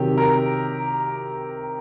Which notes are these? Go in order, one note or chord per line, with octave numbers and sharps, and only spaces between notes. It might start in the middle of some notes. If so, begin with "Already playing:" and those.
Already playing: C3 D#3 F#3 G4
A#4